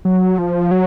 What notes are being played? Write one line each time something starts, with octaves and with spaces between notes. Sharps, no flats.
F#3
F3
F#3